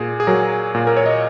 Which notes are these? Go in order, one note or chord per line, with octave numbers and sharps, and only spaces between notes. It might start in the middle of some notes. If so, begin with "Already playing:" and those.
Already playing: A#2 G#4
G#4
F#3 A#4
A#2
A#4
C#5
D#5